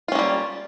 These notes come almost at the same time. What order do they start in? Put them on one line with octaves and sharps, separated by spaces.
F4 C#4 A#3 G3